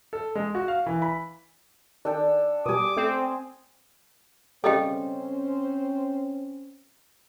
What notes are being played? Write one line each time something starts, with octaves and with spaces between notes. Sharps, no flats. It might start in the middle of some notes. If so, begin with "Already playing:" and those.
A4
G#3
F#4
F5
E3
B5
D#3 D4 A4 G5
B2 G3 G#5 D6 D#6
A3 C4
C#3 G3 C4 C#4 A4 C5 D#5 G5